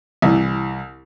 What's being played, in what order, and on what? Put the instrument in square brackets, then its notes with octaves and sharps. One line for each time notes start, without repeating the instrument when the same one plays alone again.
[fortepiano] C2 E3